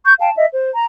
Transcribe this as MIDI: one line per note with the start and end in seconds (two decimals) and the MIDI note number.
0.05 0.14 85
0.05 0.14 91
0.20 0.30 77
0.20 0.30 79
0.20 0.30 81
0.36 0.46 75
0.36 0.46 76
0.51 0.70 72
0.73 0.86 82